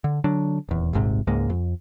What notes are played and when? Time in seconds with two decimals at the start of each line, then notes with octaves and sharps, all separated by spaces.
0.04 D3
0.24 D3 F#3 D4
0.69 D#1 E2
0.93 D#1 G#1 G#2 C3
1.27 C#2 G#2 G#3 A#3
1.50 F2